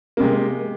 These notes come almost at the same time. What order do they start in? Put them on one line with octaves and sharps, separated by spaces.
A#3 C3 G#3